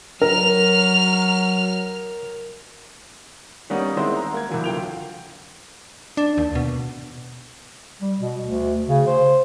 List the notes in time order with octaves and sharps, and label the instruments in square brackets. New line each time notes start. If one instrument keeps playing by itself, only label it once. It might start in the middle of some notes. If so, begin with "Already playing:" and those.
[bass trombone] F#3 [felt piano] A#4 [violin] F6 F7
[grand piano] D#3 G3 A#3 B3 C#4 D#4
D#3 G#3 B3 C4 E4 C5
A#5
A#3 A#4 G#6
C2 E3 F#3
D2 F4 G5 F7
[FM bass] D4
D#2
B2
[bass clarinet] G3
B2
D2
C#3
C5